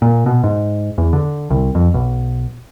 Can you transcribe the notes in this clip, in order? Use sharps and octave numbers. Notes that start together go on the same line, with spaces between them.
A#2
B2
G#2
E2
D3
C2
F2
B1